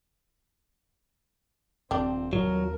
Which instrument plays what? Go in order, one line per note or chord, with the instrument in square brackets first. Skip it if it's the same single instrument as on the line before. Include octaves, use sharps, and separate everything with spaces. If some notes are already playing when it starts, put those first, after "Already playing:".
[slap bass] D#1 F3 [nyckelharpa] C4 [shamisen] D4 G4
[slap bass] D#1 F3 [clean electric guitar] F#3 [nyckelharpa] A#4